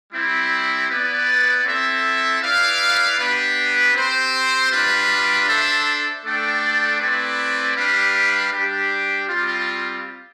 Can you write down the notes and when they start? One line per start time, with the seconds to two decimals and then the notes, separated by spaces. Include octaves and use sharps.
0.12 G3 C4 E4
0.89 B3 E4 B4 D5
1.65 C4 E4 A4 E5
2.41 E4 B4 D5 F5
3.18 B3 D4 G4 B4
3.94 C4 G4 C5
4.70 G3 D4 F4 B4 D5
5.47 D4 A4 C5 E5
6.23 A3 D4 A4 D5 G5
6.99 A3 C4 E4 B4 D5
7.75 G3 D4 G4 B4 F5
8.52 G3 D4 G4
9.28 G3 C4 F4